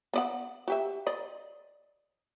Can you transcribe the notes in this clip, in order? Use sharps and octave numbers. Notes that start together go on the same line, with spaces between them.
B3 D5 F#5
F#4 G4 E5
D5 D#5